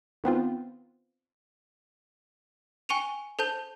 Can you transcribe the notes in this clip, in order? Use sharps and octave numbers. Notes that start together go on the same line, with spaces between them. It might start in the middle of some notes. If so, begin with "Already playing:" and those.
D#3 B3 C4 F4
G5 G#5 C#6 C#7 D#7 F7
A4 C5 A5 G6 F7